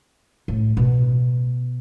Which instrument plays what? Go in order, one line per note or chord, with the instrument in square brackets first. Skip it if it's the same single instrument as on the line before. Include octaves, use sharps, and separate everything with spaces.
[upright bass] A2
B2